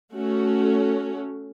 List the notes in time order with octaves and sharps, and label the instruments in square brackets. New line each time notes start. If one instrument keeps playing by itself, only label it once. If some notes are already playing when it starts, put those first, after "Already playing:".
[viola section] A3 C#4 F#4